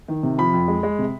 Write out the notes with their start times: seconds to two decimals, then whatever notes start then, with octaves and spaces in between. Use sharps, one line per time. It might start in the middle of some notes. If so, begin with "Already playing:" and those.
0.08 D#3
0.23 C3
0.38 F3 B5
0.54 F2
0.68 G#3
0.83 G#3
0.99 C3